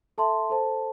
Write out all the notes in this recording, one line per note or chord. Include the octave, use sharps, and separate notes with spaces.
A4 E5 A5 C6
A4 C5 A5